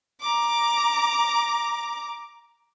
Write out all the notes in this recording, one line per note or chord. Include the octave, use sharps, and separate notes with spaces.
A#5 D6